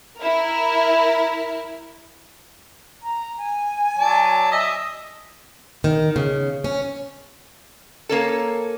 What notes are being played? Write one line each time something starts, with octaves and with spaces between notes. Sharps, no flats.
E4 A#4
A#5
G#5
F#3 D5 A5
D#5 E5
D#3
C#3
C#4
A#3 C#4 A4